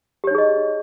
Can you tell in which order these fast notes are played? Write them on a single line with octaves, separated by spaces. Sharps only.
G4 C#5 D#4 G#4 D#5